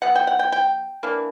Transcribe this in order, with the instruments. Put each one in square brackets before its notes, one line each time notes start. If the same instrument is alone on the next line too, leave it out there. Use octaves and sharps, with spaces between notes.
[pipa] F#3 B3 F#5
G5
F#5
G5
G5
E3 A#3 D4